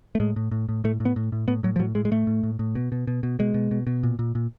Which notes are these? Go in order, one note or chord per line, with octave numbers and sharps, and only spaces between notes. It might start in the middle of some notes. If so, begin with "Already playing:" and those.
A3
A2 G#3
A2
A2
A2
A2 A3
A2
B3
A2
A2
A2 B3
A2 F#3
F3
A2 F#3
A2 G#3
G#3
A2 A3
A2
A2
A2
B2
B2
B2
B2
B2 G#3
B2
B2
B2
A#2
A#2
A#2